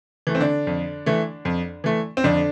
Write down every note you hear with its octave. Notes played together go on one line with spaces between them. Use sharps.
E3 A3
C4
D3 D4
F2
E3 A3
F2
E3 A3
C4
F2 D3 D4